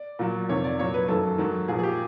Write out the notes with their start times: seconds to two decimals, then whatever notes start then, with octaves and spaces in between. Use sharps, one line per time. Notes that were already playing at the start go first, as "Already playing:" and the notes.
Already playing: D5
0.19 A#2 F#3
0.49 F2 C3 D#3 C#5
0.64 D5
0.79 A#2 F#3 C#5
0.94 B4
1.08 F#2 D#3 F#3 A4
1.38 G#2 D#3 F#3
1.68 A#2 G#4
1.73 F3
1.79 G#4
1.83 G4